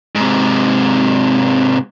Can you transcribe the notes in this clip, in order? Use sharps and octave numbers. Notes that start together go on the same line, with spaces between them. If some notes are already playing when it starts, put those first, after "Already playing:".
G#2 C3